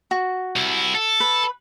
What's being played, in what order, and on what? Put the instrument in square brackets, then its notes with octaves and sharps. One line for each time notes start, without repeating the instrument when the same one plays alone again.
[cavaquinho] F#4
[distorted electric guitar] C2 E4
A4
[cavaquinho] B4